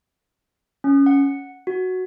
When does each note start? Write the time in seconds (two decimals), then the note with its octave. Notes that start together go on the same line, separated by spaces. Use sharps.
0.84 C#4
1.06 F#5
1.67 F#4